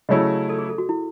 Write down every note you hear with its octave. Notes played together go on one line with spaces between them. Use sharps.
C#3 F#3 A3 C#4 E4 D#5
A4
G#4
A4
F#4
E4